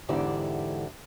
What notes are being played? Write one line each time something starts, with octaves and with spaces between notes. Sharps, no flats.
E2 G#2 D3 E4 G4 D5